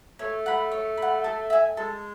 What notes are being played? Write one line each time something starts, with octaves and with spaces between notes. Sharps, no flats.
A3 C#5
F#5 B5
C#5
F#5 B5
A4
E5 G#5
G#3 A4